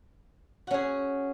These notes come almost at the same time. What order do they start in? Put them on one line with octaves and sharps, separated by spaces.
F#4 C#4 G#4